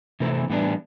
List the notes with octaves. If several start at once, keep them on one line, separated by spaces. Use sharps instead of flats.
C3 E3 A3 C4
A2 E3 G3 B3 D4